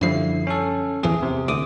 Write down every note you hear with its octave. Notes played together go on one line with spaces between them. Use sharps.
F#2 D3 F3 G3 E4 C7
C#4 A4
A1 E2 E3 G#4
C3
D2 D6 D#6